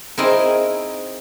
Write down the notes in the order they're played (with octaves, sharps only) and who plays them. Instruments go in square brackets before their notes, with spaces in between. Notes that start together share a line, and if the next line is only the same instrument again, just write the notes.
[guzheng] C4 D#4 E4 G#4 A#4